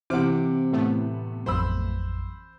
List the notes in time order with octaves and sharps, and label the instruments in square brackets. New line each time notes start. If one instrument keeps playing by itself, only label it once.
[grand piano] C3 F#5 [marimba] E3 C4 F6 [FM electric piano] E4 C5 [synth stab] D6
[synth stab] A2 A3 B3
[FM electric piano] A1 F2 F#3 [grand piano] C5 B5 E6